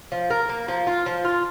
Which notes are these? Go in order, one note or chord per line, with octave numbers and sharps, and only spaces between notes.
F3
A#4
A#3
F3
F4
F3
F4